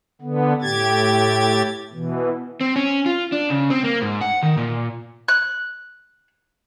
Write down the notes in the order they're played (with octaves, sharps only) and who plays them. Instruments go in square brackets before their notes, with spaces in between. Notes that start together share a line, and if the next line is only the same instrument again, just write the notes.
[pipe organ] D3 B3
A2 G4 G#6 A6
B2 E3
[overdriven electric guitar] C4
C#4
F4
D4
C#3
C4
A#3
G#2
F#5
D#3
A#2
[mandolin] F#6